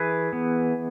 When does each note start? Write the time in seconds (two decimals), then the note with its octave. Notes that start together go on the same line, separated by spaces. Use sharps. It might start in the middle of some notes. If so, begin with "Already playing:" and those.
Already playing: E3 G#4 B4
0.33 B3